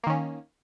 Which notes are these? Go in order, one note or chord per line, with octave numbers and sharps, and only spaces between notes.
D#3 A#3 C#4